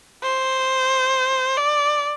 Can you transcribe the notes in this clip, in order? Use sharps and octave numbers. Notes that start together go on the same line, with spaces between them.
C5
D5